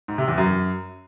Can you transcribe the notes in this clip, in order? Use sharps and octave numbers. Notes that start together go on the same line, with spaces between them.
G#2
C3
E2
F#2